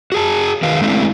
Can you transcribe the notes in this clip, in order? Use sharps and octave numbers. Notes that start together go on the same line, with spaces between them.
F#4 G#4 A5
D#3 B4 F5
G#3 A3 C4 D4 E4